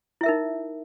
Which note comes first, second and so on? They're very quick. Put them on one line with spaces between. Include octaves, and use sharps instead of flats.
E4 E5 A#4 D#4